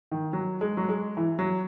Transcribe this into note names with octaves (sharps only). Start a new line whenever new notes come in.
D#3
F#3
G#3
F#3
G#3
E3
F#3